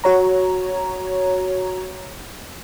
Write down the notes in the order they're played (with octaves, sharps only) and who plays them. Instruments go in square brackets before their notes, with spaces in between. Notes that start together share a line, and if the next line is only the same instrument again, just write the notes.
[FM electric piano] F#4 C#5 A#5